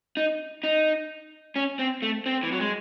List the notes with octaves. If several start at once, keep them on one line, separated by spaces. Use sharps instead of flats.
D#4
D#4
C#4
C4
A3
C4
E3
F#3
G#3